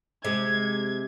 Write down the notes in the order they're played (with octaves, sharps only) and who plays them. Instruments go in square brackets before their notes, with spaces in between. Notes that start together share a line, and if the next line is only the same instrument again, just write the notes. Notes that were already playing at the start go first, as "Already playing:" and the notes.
[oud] C3 G#3 [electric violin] G#6